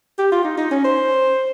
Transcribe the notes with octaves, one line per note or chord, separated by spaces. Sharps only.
G4
F4
D#4
D#4
C#4
C5